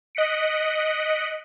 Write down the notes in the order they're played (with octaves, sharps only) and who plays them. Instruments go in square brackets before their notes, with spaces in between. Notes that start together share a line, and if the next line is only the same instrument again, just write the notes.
[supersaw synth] D#5 F#6 B6 C#7 D7